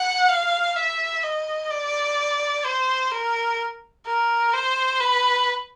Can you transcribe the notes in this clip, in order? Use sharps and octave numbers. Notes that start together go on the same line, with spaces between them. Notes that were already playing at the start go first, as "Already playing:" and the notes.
Already playing: F#5
F5
E5
D#5
D5
C5
A#4
A#4
C5
B4